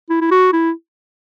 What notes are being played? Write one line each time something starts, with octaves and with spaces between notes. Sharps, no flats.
E4
E4
F#4
E4